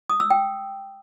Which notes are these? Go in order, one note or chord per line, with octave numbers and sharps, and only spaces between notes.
D#6
E6
G5